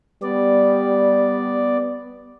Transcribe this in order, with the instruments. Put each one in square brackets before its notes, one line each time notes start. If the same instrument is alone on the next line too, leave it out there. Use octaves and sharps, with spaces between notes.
[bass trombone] G3 [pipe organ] B3 D5